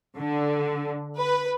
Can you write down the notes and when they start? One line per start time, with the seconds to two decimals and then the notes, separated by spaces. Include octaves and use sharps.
0.17 D3
1.18 B4